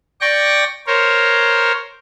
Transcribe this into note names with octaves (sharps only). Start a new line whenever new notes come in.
D5 G5 C#6 A#6
A#4 C5 C#5